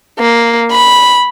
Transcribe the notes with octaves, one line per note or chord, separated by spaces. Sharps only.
A#3
B5